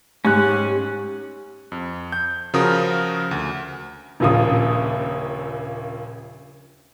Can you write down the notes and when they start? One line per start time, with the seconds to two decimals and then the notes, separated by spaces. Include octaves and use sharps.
0.25 G#2 C#4 G4 F#6
1.72 F2
2.12 G6
2.54 C#3 F3 F#4 A#4 D#6
3.31 D2
4.20 D#1 A#1 A#2 C#3 D#6